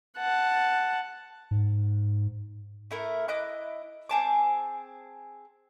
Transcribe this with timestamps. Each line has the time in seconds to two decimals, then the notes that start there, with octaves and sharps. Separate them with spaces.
0.17 F#5 A5
1.51 G#2
2.91 A3 E4 A#4
3.28 E4 D#5 D6 F#6
4.09 C4 G#4 A5 D6